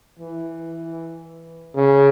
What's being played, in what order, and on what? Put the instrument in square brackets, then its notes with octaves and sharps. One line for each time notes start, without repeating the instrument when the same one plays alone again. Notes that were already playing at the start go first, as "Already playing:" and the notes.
[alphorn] E3
C#3